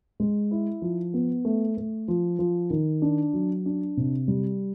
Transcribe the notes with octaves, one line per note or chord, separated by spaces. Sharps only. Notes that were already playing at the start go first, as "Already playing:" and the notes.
G#3
E4
F3
B3
A3
A3
F3
F3
D#3
D4
F#3
D4
C3
G3